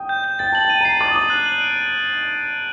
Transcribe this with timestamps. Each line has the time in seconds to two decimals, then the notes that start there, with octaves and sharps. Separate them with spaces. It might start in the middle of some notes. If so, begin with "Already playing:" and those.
Already playing: G5 D#6
0.09 G6
0.24 G6
0.39 G5 A6
0.53 A5 F#7
0.65 G5 D#7
0.81 A#5
0.85 A5 C7
1.00 D6 A6
1.11 D#6
1.15 D6 F#7
1.30 F#6
1.46 F#7
1.61 D7